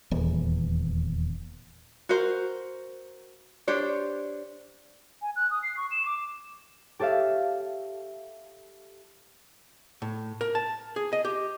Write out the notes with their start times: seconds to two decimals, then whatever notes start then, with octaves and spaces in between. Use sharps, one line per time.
0.11 D#1 E2
2.09 F#4 A#4 C5
3.67 D4 G4 C5 C#5
5.22 G#5
5.36 F#6
5.51 D#6
5.63 C7
5.77 C#6
5.91 E7
6.06 D6
6.99 G4 A4 C#5 E5 F5
10.02 A2
10.41 A#4
10.55 A5
10.96 G#4
11.13 D#5
11.25 G4